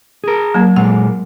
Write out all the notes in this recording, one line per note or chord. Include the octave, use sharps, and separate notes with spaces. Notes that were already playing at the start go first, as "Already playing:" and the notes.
G#4 A#4
F#3 A#3
A#2 G#3 A#3 F#5